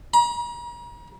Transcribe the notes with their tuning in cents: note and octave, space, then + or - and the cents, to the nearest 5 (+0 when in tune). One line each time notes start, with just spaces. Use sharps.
A#5 +40